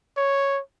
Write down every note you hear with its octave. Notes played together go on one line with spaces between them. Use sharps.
C#5